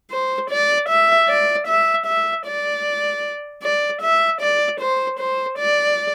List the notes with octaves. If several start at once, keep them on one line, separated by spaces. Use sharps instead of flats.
C5
D5
E5
D5
E5
E5
D5
D5
E5
D5
C5
C5
D5